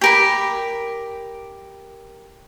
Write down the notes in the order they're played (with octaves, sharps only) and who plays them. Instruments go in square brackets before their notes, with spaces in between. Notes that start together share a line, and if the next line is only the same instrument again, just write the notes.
[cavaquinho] G4 A#4 B5